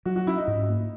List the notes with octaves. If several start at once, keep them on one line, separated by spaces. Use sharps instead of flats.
F#3 F#4
F#4
C#4 E4
D#4
G#2
A#3